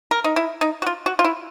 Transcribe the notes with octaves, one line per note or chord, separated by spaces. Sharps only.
A#4
D#4
E4
D#4
F#4
F4
F#4
F4
E4